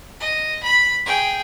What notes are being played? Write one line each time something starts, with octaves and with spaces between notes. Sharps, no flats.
D#5
B5
G#4 G5